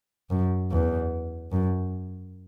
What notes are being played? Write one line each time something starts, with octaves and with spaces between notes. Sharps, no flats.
F#2
E2
F#2